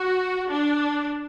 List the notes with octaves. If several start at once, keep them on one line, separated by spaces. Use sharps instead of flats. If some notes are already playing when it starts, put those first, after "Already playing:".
Already playing: F#4
D4